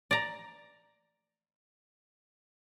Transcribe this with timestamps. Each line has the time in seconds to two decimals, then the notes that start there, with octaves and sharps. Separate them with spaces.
0.11 D5 A#5